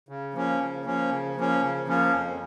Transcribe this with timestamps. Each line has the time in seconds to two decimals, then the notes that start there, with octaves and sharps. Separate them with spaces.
0.09 C#3
0.34 F3 A#3 C#4
0.60 C#3
0.85 F3 A#3 C#4
1.11 C#3
1.36 F3 A#3 C#4
1.62 C#3
1.87 F3 A#3 C#4
2.13 F2